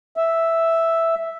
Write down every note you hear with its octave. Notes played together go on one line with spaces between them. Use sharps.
E5